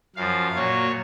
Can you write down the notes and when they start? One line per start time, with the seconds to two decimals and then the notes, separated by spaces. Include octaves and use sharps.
0.16 F#2 F3 F5
0.55 A#2 F#3 C#5